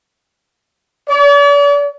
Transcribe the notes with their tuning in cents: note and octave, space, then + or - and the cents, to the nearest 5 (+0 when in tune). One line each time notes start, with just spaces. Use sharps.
D5 -45